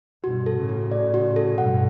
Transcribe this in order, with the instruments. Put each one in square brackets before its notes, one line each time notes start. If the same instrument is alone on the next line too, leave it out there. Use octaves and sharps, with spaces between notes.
[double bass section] G2 B2 [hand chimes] F#4
[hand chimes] A4
[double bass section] A2 C#3
[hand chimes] F#4
D5
F#4
A4
[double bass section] G2 B2 [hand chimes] F#5